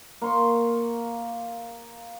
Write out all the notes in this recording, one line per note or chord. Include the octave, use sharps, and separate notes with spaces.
A#3 C6 C#6